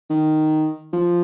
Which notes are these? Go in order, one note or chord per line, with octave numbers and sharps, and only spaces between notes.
D#3
F3